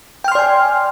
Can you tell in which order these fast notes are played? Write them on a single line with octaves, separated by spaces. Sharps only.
G5 F6 C6 D5 G#5